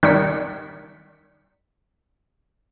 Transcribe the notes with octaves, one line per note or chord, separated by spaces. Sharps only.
D#3 G3 B6 C#7